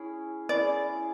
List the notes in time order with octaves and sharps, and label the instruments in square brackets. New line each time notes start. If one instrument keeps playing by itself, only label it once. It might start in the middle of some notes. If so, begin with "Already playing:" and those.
Already playing: [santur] C#4 E4 G#4
[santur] C#4 E4 G#4 [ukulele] D5